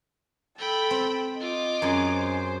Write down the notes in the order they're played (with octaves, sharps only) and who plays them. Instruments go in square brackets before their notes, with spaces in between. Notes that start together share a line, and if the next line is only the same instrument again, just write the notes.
[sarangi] A4 [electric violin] G5 B5
[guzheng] C4
[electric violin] F4 D6 [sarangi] D#5
[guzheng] F#2 G#4
[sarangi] C5